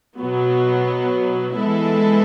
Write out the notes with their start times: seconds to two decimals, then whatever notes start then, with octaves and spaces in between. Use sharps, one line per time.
0.18 B2 F#3 B3
1.57 E3 G#3 B3 E4 A4